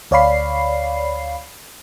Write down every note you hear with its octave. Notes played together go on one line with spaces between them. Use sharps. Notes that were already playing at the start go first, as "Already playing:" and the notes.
D2 C#5 D5 F5 B5 C7